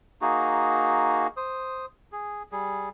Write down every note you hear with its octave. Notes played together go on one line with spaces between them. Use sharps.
A#3 D#4 F#4 G#4
C5 D#6
G#4
G3 G#4